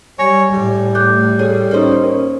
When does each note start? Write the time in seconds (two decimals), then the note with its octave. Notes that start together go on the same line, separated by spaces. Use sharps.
0.19 G3 C#5 G#5 A#6
0.52 A2 G3
0.95 A3 D6 F#6 G6
1.39 G#4 A4 C#5
1.71 A#3 C#4 D#4 C5
2.03 C#4 A#4